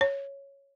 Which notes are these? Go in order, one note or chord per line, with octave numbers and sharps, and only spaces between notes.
C#5